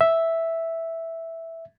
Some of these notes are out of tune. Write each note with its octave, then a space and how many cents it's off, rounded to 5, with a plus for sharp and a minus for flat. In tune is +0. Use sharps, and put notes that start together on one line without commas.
E5 -5